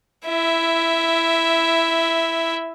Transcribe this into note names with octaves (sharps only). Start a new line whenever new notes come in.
E4 E5